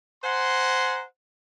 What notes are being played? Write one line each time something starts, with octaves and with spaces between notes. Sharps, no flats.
C5 F#5 G#5 A#5 C6